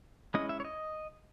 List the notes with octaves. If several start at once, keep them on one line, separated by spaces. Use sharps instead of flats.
G#3 C#4 E4 D#5
E5
C#5
D#5